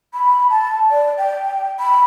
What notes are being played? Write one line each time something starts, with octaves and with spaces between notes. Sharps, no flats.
B5
A5
D5
G5
B5